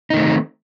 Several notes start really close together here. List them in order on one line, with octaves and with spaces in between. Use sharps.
D#4 D#3 A3 C4